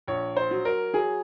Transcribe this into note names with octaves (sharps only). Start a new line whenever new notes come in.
A#1 C#5
C5
F#3
A#4
F#3 G#4